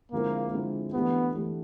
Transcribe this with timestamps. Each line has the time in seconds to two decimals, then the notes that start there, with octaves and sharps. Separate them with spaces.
0.12 D3 F3 G#3 A#3 C4 E4
0.53 D3 F3 G#3 C4 E4
0.93 E3 A3 B3 D4 G4
1.35 E3 A3 D4 G4